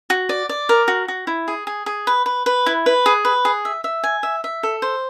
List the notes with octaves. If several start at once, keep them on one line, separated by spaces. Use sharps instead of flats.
F#4
D5
D5
A#4
F#4
F#4
E4
G#4
G#4
G#4
B4
B4
B4
E4
B4
G#4
B4
G#4
E5
E5
G#5
E5
E5
A4
C5